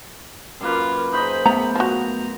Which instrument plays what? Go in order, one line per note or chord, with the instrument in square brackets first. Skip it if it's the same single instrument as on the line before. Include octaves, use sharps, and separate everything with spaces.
[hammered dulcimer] F#2 A#3 B4 [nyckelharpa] F4 A#4
[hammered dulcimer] D#4 C5 D#5 [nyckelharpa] G#4 B5
[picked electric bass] A3 B3 [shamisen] A#5
[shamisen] F3 F#4 [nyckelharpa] A#5